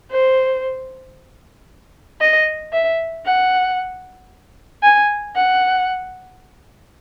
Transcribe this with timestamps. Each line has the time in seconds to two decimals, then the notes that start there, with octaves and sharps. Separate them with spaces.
0.12 C5
2.21 D#5
2.73 E5
3.26 F#5
4.83 G#5
5.36 F#5